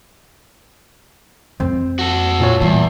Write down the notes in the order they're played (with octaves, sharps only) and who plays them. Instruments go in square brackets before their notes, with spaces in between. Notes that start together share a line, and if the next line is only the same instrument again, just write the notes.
[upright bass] F2 G#3 [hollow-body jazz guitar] C4
[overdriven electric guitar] F#4 A4
[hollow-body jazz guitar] A#2 F4 C#5
[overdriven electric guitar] E2 [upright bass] E3 G3